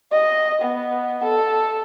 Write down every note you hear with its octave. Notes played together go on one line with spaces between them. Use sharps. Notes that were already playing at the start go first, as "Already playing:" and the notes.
D#5
B3
A4